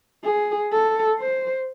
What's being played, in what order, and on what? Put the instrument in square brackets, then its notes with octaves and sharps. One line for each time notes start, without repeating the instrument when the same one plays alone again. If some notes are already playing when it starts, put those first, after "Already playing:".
[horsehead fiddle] G#4
A4
C5